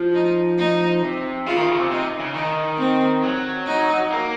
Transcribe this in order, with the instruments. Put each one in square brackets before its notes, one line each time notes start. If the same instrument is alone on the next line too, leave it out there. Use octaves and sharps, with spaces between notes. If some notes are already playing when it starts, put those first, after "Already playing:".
Already playing: [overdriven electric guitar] F3
[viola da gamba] D#4
D#4
[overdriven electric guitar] C3
[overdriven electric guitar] C#3 [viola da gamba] F4
[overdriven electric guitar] D#3
C#3
C3
[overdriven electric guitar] C3 [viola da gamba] D#4
[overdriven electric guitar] C#3
[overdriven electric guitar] D#3 [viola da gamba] D#4
[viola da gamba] C4
[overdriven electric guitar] F#3
[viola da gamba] D#4
[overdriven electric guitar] A#3